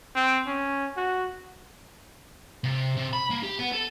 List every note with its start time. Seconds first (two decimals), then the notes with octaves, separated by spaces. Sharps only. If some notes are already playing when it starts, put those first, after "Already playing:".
0.15 C4
0.47 C#4
0.97 F#4
2.64 C3
2.97 C3
3.13 B5
3.30 A#3
3.43 G4
3.59 B3
3.72 A4